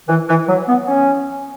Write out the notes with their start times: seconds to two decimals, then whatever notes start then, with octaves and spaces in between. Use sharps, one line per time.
0.08 E3
0.29 E3
0.48 F#3
0.69 B3
0.88 C#4